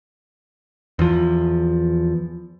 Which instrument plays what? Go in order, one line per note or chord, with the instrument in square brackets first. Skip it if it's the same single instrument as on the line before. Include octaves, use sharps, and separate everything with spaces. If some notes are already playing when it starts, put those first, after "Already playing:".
[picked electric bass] E2 F3